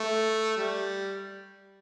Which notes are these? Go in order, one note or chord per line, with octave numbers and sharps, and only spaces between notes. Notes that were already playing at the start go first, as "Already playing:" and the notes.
Already playing: A3
G3